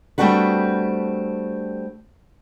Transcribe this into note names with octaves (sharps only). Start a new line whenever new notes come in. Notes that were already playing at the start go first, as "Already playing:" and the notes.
G3 A3 C4 D4 F#4 B4